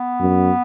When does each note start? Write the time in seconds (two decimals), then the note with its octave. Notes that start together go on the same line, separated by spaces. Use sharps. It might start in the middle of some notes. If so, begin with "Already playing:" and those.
Already playing: B3
0.20 F#2